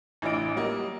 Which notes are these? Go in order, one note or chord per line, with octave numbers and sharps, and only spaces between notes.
A1 E3 D4 F4 D#5 D7
F#3 G3 A#3 D#5